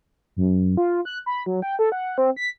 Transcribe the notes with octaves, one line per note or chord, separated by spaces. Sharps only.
F#2
F4
F#6
B5
F#3
G5
A4
F#5
C4
B6